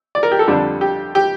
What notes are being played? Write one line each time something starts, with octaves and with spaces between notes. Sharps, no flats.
D5
A#4
G4
A4
F2 D3 G3 D4
G4
G4